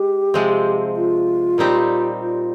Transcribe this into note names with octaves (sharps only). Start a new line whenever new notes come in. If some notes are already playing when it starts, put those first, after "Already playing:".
Already playing: G#3 G4
C3 F3 G#3 C4
F4
A#2 G3 C4 D#4 G4
F4